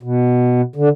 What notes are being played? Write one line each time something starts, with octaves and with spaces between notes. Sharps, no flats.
B2
D3